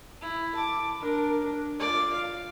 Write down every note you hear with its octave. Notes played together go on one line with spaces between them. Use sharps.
E4
A5 D6
D4 A#4
D4
F4 D5
F5